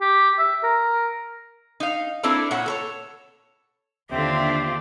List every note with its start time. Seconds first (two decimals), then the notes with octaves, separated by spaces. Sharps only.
0.01 G4
0.39 E5
0.63 A#4
1.80 D#4 F5
2.23 A#3 C4 D4 E4 A4 B4
2.51 A#2 C#5 F#5
2.66 A4 A#4 C#5
4.10 D#2 D3 C4 D4 F4 G4 E5